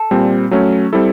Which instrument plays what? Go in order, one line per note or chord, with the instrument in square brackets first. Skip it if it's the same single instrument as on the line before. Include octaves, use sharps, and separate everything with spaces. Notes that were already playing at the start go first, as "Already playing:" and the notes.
Already playing: [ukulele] A4
[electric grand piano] A#2 G3 C4
F#3 A3 C#4
G3 C4 E4 A4